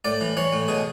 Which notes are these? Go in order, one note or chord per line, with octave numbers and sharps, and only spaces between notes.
A2 D5
E3
E3 C#5
A2
B2 G#4